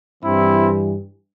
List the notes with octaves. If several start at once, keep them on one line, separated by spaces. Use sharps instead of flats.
G2 E3 G3 C4 E4